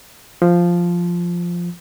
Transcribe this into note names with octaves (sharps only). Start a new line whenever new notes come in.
F3